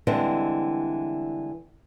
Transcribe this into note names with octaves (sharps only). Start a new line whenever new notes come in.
D3 E3 G3 G#3 C4